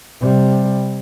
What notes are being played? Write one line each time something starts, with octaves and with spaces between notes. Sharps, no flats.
C3 G3